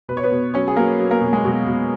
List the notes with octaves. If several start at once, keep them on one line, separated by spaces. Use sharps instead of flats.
B2 B4
C#5
B3 B4
B2
F#3 C#4 C#5
G#4
F#3 A#3 A#4
F#3
A#3 A#4
B2
G#3 G#4
B2 F#3 F#4
B2